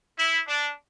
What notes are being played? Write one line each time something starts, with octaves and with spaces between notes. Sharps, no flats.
E4
D4